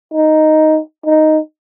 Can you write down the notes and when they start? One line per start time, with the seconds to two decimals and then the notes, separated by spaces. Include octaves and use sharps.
0.13 D#4
1.06 D#4